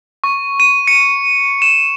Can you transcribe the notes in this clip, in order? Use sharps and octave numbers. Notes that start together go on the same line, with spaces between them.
C#6
D#7
C#7
E7